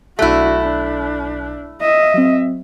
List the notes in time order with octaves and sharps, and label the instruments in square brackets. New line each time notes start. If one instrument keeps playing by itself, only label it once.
[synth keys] B1 F#6 B6 [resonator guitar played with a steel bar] A3 E4 [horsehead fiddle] D4 F#4
[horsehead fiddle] D4
D#5 E5
[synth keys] F#3 C4